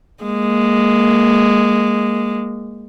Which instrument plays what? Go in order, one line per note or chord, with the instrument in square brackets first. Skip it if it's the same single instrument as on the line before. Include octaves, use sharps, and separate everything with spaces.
[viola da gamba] G#3 A#3